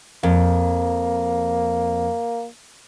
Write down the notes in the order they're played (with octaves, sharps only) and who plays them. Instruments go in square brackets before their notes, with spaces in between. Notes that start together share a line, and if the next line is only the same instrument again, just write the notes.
[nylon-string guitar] F2 [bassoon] A#3